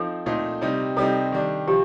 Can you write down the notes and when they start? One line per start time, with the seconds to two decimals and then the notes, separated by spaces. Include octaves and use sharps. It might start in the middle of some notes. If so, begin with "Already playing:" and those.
Already playing: F3 C4 D#4 A4
0.26 A#2 A3 C4 D#4
0.62 C3 G3 C4 D#4
0.97 C3 G3 C4 D#4 A4
1.32 D#3 G3 D4
1.68 C3 F3 C4 G4